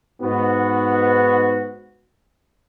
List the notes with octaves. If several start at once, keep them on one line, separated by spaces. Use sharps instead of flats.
G#2 B3 F#4